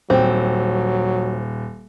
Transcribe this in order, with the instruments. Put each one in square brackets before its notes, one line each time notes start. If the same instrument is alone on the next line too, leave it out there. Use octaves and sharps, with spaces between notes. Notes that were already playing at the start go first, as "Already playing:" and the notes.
[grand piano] D#1 G5 [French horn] F#3 [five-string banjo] C4